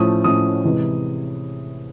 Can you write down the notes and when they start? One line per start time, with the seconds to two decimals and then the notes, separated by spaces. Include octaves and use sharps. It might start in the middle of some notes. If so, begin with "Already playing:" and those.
Already playing: A2 F3 A3 C#4 D#6
0.24 A2 F3 A3 C#4 D#6
0.64 C3 E3 G#3